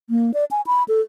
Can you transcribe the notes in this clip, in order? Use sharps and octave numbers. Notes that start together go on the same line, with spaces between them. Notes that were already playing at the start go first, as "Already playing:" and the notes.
A#3
D5
G#5
B5
A4